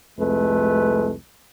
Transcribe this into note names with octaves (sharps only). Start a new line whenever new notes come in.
C2 F2 G#3 A3 B4